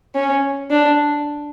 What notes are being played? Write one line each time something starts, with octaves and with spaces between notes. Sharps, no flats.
C#4
D4